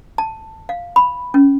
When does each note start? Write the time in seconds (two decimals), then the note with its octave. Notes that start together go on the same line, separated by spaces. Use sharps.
0.18 A5
0.69 F5
0.96 B5
1.34 C#4